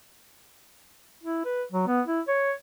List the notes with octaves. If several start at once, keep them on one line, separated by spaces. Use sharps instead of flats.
E4
B4
F#3
B3
E4
C#5